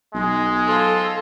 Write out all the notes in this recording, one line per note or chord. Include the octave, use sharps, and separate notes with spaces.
B1 G#3
F4 A4 C5